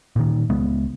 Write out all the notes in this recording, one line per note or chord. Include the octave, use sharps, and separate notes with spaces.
A#2 D#3
C#2 G#3 B3